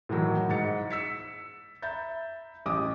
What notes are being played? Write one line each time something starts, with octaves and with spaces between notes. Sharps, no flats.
A2 D#3 E3 F#3
G#2 A6 C#7
E6 B6 C#7
E5 A#5 B5 G6 A6
A1 D6 D#6